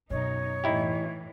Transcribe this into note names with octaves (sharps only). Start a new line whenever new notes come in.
F#2 B2 D#4 C#5
A2 E3 D#4 E4 G4